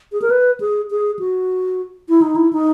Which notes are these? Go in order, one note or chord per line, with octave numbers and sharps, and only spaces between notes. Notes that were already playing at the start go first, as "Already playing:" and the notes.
G#4
A#4
B4
G#4
G#4
F#4
E4
D#4
E4
D#4